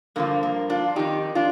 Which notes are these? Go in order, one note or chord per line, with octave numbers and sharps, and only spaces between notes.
G2 D3 F3 A#3
A#3
D4 F4
F2 D#3 D#4 G4
D4 F4